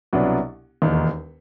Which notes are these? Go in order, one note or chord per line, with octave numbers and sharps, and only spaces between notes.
C2 B2 F#3 B3 D4
E1 D#2 D#3